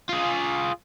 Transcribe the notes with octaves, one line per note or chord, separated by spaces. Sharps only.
F4 G#4